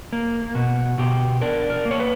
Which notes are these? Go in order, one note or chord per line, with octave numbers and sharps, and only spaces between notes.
A#3
B2 F#4
B2 G4
D4 A#4
A#4
A#3
C#5
B4